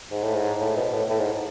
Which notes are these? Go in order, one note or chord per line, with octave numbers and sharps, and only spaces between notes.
G#2
A2
G#2
A2
B2
A2
A2
G#2